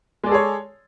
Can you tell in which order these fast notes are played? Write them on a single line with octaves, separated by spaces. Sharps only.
G#3 D5 A4 G#4 C#5